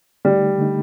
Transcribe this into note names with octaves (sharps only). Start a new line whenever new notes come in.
D3 G3 A3 D#4
D3 A3 D#4